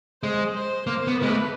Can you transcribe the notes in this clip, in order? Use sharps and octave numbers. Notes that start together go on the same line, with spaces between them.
G#3 C5
C5
A#3 C5
B3
G#3 B4
A3